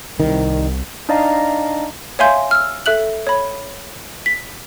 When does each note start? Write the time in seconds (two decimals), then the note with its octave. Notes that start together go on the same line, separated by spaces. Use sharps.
0.20 C2 D#3
1.09 D4 D#4 D5 D#5 F5 A#5
2.19 C#5 E5 F5 G#5 C6 G6
2.51 E6 F6
2.86 A4 E5 F#6 F#7
3.27 C#5 B5
4.26 B6